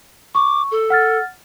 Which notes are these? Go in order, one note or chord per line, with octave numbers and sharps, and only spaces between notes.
C#6 D6
A4
F#5 F6 A6